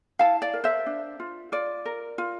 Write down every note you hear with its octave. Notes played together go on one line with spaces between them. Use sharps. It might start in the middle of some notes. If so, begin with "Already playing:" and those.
E4 F5 A5
D5
A#4
C5 E5
D4
F4
F4 D5
A#4
F4